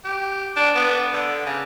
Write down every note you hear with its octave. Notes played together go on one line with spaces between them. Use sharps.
G4
D4
B3
D3
C#3